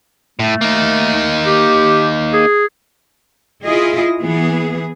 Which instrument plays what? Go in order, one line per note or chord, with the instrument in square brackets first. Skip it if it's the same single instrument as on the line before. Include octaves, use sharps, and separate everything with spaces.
[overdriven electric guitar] A2 [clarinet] A3
[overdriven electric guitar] A#3 D#4
[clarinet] G4
G#4
[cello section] E4 F4 G#4 D#5
E3 B3 G#4